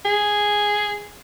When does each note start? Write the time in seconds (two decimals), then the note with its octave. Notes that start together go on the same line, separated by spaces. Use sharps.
0.05 G#4